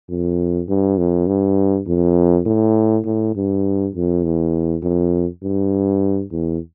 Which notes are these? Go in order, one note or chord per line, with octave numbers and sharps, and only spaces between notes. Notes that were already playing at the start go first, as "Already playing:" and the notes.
F2
G2
F2
G2
F2
A2
A2
G2
F2
E2
F2
G2
E2